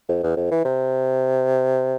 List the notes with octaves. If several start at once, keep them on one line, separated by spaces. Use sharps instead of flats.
F2
E2
F2
E3
C3